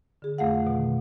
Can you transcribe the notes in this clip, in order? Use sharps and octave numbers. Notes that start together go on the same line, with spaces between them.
D3 G#4
F2 A3 F5 F#5
B2 D#3